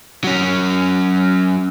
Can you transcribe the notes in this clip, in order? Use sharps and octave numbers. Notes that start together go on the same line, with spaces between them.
F#3 C#4